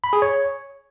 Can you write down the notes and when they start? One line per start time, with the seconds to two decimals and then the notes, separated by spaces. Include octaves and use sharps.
0.04 B5
0.13 G#4
0.22 C#5